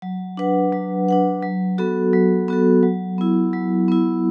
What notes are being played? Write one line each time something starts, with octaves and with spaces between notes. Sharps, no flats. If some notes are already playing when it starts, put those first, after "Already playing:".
F#3
D4 B4 F#5
F#3
D4 B4 F#5
F#3
B3 F#4 A4
F#3
B3 F#4 A4
F#3
B3 E4
F#3
B3 E4